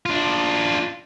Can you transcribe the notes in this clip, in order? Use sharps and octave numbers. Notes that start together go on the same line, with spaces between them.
D4 F4